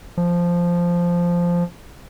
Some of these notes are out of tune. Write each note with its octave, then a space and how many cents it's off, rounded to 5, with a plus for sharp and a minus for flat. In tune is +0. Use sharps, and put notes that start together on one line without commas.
F3 -5